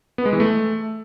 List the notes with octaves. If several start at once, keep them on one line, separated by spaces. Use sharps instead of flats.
B3
G#3
E3
A3